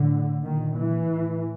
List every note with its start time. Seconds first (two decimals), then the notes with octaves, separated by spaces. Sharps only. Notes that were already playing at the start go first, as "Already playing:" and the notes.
Already playing: A2 D3
0.44 A#2 D#3
0.77 E3
1.08 A2